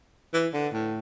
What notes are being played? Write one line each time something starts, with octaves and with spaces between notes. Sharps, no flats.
E3
D3
A2